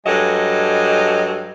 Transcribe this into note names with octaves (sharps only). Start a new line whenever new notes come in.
G2 F#3 G#3 A4 D#5